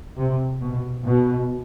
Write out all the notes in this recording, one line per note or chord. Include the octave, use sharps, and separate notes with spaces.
C3
B2
B2